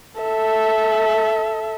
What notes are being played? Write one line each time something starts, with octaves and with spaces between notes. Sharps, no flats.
A4 E5